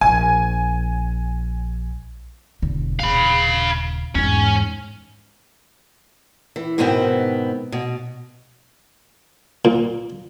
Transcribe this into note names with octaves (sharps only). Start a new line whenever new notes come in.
A#1 G#5
E1 D3
D#1 C#3 F5 B5
E2 G#2 C#4
E3
G#2 B2 D#3 B3 C4
B2
A#2